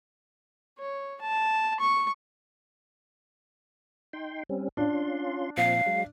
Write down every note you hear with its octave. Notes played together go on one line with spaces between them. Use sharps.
C#5
A5
C#6
D#4 G5 C6
G3 C4 C#4
C#4 D4 F4 C6
A#2 F3 C4 F5
F#3 G#3